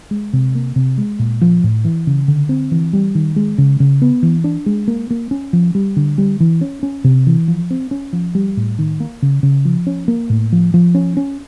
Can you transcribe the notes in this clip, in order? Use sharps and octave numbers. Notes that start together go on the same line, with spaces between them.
G#3
C3
A#3
C3
G#3
A#2
F3
A2
E3
C#3
D3
C4
E3
G3
D#3
G#3
C#3
C#3
B3
E3
D4
G#3
A#3
A#3
C#4
F3
G3
D3
G3
E3
C#4
C#4
C3
E3
F3
C4
C#4
F3
G3
A2
D#3
A#3
C#3
C#3
F3
C#4
A#3
A2
F3
F3
C#4
C#4